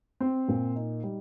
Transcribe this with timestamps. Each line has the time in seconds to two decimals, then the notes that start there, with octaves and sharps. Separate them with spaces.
0.20 C4
0.48 A#2
0.76 D#4
1.03 G3